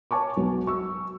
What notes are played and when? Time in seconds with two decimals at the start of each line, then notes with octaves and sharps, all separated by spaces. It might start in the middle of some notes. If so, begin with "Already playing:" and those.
0.11 C#5 G#5 A5 C#6 D6
0.37 B1 F#3 B3
0.67 C#6 E6